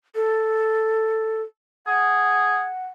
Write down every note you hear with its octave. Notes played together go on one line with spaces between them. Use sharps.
A4
G#4 F#5